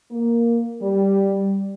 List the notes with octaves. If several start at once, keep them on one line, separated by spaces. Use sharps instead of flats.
A#3
G3